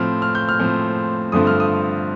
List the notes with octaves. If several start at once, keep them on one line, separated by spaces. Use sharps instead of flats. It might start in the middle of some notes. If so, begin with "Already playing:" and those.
Already playing: A2 F3 C4 F6
F6
G6
F6
A2 F3 C4
G2 D3 F3 A3 C4 D#6
F6
D#6